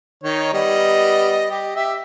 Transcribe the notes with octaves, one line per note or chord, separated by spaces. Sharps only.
D#3 D#4 C#5
G3 B3 D#5
G4
G4 E5